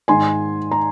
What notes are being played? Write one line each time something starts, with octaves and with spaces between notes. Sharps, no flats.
G#2 D#3 G#5 C6
A#5